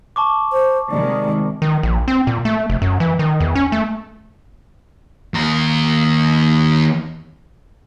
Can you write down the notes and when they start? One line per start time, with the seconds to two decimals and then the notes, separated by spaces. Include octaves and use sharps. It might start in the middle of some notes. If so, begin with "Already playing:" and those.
0.16 A5 C#6 D6
0.52 C5
0.91 C3 D#3 G#3 D5
1.62 D#3
1.83 A#1
2.08 C4
2.27 A#2
2.45 A3
2.70 F1
2.82 F#2
3.00 E3
3.19 D#3
3.40 E2
3.55 C#4
3.72 A3
5.34 D#2 A#4